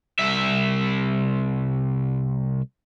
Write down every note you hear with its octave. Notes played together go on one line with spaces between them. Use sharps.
C2 E5